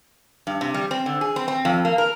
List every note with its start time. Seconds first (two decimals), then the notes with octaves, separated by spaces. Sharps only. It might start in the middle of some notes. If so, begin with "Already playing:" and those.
0.47 G2
0.61 C3
0.74 G3
0.91 C4
1.06 D3
1.21 G#4
1.36 C4
1.48 C4
1.65 F2
1.85 A#3
1.98 A#4